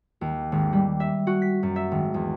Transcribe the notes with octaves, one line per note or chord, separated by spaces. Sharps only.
D#2
G#1
G3
E5
F#4
B6
F#2
E5
G#1
E2